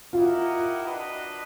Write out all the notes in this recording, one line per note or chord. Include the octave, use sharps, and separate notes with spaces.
E4 F4 G4 A#4 D#5 F#5
D4 F#4 B4 D#5